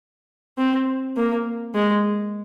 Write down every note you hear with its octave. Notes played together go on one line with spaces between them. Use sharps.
C4
A#3
G#3